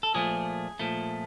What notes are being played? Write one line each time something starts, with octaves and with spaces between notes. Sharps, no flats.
A4
A#2 F3 A3 G#4
A#2 F3 A3